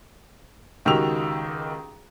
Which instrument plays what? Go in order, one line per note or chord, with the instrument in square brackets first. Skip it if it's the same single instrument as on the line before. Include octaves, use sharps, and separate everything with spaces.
[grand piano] C#2 D#3 F#4 G4 E6 F7